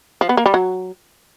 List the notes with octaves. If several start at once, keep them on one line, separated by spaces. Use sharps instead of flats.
F3
B3
A#3
G3
F#3